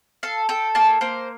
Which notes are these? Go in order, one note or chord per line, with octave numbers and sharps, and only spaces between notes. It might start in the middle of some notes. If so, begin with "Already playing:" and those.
A4 F5
A4 G5
A#3 A5
A#3 C5